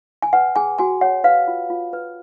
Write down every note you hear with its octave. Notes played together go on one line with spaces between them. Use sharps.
G#5
B4 F#5
G#4 G#5
F#4 G#5
C#5 F#5
B4 F5
F4
F4
B4